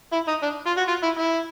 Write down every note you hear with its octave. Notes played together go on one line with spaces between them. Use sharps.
E4
D#4
D4
F4
F#4
F4
E4
E4